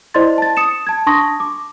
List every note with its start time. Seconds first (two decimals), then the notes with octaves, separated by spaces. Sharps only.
0.14 E4 C5 D5 D#5 C6 A6
0.38 A5 A6
0.57 D#6 C#7 E7
0.87 A5 G#6
1.07 D4 A5 C6 C#6 D#6 A#6
1.40 D6